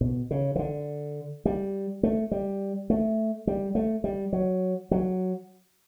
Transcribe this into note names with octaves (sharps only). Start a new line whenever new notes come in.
B2
C#3
E3
D3
G3
A3
G3
A3
G3
A3
G3
F#3
F#3